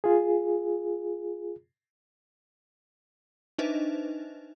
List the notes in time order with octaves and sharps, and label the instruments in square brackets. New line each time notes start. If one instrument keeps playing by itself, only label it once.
[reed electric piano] F4 G#4
[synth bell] D4 D#4 B4 C5 D#5 E5